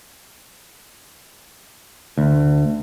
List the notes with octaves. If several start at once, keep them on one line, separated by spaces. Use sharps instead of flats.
D2